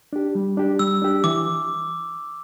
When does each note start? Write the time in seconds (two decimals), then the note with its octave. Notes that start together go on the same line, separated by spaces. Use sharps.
0.13 D4 G4
0.35 G3
0.57 D4 G4
0.79 G3 E6
1.02 D4 G4
1.24 E3 D6